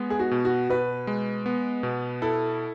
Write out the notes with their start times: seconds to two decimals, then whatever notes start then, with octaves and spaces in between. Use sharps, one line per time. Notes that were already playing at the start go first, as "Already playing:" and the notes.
Already playing: G#3 B3
0.10 G#4
0.19 F#4
0.31 B2
0.45 F#4
0.69 B2 B4
1.07 G#3
1.46 B3
1.83 B2
2.22 E4 A4